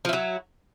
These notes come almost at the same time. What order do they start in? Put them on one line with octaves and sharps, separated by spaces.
F3 E4 F#3